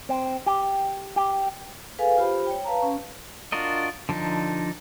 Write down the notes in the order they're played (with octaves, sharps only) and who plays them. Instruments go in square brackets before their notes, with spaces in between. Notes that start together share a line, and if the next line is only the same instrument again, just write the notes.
[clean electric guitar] C4
G4
G4
[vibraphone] G#4 A4 B4 F5 G#5
F4 G4 C5 B5
C#5 G5
B4 F5 A5 A#5
C#4
[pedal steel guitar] D4 F4 F#4 A#4 D#5
D3 F3 D4 D#4